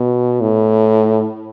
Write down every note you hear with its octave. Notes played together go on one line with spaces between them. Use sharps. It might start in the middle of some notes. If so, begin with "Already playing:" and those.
Already playing: B2
A2